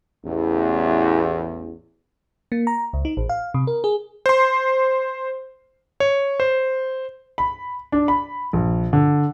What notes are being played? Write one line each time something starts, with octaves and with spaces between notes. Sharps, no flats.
A1 E2
A#3
A#5
C#2
D#4
A1
F5
C3
A#4
G#4
C5 C6
C#5
C5
B5
D4
B5
A#1
D3